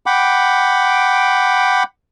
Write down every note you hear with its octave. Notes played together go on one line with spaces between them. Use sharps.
F#5 G5 B5 D6